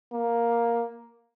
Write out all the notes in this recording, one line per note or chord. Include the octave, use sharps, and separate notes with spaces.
A#3